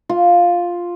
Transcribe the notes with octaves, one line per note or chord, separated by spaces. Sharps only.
F4